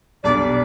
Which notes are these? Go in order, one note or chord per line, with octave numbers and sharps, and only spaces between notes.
B1 B2 G3 D4 D5